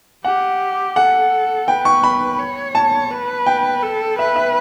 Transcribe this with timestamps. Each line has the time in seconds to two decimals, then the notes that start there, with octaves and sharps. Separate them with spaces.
0.24 G4 F#5
0.96 A4 F#5
1.68 B4 G5
1.85 C#6
2.04 B5
2.39 C#5
2.75 A5
3.11 B4
3.46 G5
3.83 A4
4.18 B4 E5
4.36 E5